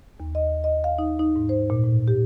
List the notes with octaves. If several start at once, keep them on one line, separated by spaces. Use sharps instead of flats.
D#2
D#5
D#5
F5
D#4
D#4
G#2
C5
A#2
A2
G4